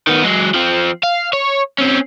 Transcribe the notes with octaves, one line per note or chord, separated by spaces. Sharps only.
D#3 B3
F#3 G#3
F3 C4
F5
C#5
C4 C#4